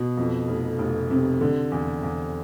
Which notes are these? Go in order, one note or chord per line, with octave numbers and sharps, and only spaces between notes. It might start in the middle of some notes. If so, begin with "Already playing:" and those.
Already playing: B2
F2
F1
F1
C3
D3
E2
E2